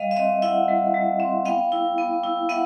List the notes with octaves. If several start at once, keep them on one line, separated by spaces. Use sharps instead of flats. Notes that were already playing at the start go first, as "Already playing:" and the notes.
Already playing: G3 D#5 F5
E5
C4 D#5 F5
E4 E5 F#5
G3
G3
C4
B3 F5 G5
E4
B3
E4
B3 E5 F#5